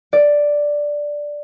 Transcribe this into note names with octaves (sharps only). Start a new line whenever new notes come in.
D5